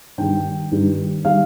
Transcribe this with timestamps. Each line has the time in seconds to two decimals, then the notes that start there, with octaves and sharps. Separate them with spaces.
0.18 G2 D#3 G3 G5
0.71 G2 D#3 G3
1.25 D#3 G3 F5